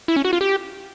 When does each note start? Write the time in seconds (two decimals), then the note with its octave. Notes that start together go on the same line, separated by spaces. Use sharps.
0.08 E4
0.16 C#4
0.25 F#4
0.33 F4
0.41 G4